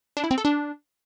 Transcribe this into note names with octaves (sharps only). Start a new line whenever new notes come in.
D4
E4
C4
A4
D4